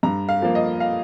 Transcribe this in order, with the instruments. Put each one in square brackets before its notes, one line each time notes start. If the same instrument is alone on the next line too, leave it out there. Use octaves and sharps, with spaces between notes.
[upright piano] G2 A#5
F5
F3 A#3
D#5
F5